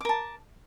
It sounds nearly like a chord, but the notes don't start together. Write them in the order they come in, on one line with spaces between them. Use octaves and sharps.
D6 A#4 A5